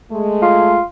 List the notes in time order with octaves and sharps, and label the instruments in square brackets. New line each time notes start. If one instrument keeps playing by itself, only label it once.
[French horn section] G#3 A3
[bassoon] F4